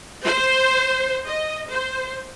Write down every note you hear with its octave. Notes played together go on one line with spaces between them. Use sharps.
C5
D#5
C5